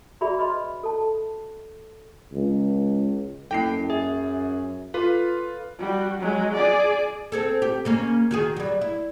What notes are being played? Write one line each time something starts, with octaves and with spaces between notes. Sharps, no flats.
F#4 G#4 D5 E5 B5
B4 D#5 B5 C6
A4 A5
C#2
F#2 A#3 E4 A4 G5 C7
G#4 E5
F4 A4 B4
G3 F#4
F#3 G#3
G#4 D5
C4 G#4 A4
G4
C#3 A#3 C#4
D#3 F#4 G#4
F#3 G3
E4